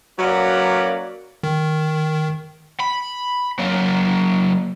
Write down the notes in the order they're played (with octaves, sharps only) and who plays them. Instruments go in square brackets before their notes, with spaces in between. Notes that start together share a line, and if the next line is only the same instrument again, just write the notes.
[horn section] F#3 A#3 C#4 F#4 B4 D5
[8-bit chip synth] D#3
[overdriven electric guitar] B5
F#3 A#3